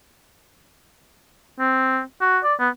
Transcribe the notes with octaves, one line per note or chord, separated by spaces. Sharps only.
C4
F#4
D5
B3